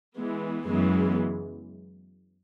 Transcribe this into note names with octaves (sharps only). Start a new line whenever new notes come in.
E3 G#3 B3
F#2 C#3 E3 G#3 B3